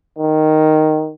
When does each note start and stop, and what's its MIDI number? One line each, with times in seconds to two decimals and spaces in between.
0.18 1.12 51